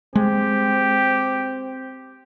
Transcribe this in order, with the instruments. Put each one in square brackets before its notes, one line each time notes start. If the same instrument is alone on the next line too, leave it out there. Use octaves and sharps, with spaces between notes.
[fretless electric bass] G#3 [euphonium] C4 [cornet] G4